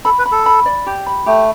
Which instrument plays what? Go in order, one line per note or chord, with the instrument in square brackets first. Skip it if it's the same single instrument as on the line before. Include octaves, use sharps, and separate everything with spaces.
[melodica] A4 [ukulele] B5
[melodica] B4
[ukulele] B5
[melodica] A4
[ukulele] B5
D5
G4
B5
[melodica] A3 [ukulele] G4